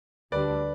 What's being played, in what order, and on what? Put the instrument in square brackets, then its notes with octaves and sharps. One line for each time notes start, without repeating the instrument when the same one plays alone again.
[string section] D2 D3 G3 D4 [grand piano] B4 D5